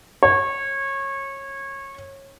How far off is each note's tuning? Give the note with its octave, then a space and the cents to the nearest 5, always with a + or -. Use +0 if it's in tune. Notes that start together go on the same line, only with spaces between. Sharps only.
C#5 -25